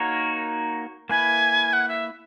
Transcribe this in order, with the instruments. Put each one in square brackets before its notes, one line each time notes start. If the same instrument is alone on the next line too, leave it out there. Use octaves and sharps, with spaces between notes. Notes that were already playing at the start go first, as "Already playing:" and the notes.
Already playing: [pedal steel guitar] A#3 D#4 F#4 A#4 C#5
[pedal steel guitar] A#3 E4 B4 [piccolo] G#5
[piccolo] F#5
E5